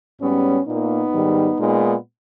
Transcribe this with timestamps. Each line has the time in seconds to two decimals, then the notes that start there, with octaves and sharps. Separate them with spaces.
0.21 G#2 G3 B3 C#4
0.67 A#2 A#3 B3 D#4
1.13 G#2 D#3 G3
1.59 A#2 G#3 B3